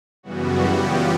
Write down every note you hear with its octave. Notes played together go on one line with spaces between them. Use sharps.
F#2 C#3 E3 G3 B3 F#4
G4
F4